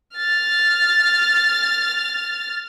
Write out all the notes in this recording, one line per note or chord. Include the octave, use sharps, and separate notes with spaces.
F6 A6